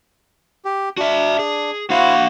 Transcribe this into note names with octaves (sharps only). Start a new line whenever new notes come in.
G4
D4 F#4 E5
G#4
A#3 D4 E4 F#4 C5 F5